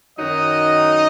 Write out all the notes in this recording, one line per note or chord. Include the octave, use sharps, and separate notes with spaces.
F#2 D#3 F#3 D#4 D#5